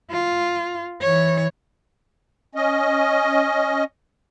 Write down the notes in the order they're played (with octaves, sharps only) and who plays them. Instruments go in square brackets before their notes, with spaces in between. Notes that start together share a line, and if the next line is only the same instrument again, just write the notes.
[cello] F4
E3 C#5
[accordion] C#4 D#5